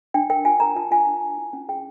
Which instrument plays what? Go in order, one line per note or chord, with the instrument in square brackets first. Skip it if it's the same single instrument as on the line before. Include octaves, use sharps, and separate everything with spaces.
[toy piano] D4 G5
A#4 G5
F4 G#5
A#4 A#5
F4 A5
F4 G#5
D4
F4
E4
C#4
G#4 G5